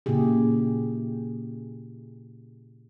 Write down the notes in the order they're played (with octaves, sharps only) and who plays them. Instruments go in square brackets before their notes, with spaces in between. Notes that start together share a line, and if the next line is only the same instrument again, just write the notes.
[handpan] A#2 C#3 E4 G4 G#4